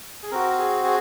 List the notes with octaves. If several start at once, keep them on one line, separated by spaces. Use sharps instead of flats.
G#4
C4 F#4 A#4
G#4
G#4